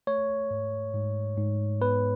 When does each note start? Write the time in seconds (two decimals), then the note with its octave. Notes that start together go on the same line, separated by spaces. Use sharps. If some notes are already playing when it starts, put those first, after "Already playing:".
0.07 A3 C#5
0.51 G#2
0.94 G#2
1.38 G#2
1.81 B3 B4